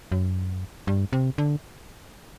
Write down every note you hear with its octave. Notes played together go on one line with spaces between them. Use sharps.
F#2
G2
C3
D3